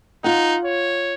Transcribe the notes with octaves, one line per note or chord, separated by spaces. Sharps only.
D#4 F4 F#5
C#5